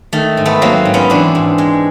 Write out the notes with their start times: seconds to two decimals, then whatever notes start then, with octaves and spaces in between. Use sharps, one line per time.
0.13 D#3 A3
0.37 G#2
0.46 A3 B3
0.62 F#3 A#3 C4
0.85 G#2
0.94 B3 C#4
1.10 E3 C4 D4
1.35 G#2
1.58 G#3